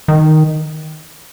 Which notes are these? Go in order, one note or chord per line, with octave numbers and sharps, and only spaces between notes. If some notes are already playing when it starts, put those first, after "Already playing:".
D#3